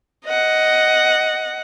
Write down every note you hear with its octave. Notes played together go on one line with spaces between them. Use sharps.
D#5 F#5